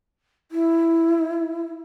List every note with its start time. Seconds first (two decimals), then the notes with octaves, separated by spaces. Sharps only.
0.52 E4